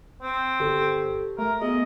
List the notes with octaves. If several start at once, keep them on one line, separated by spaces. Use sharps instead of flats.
C4
G1 G4 A4
A3 A#4
B3 G#4 D#5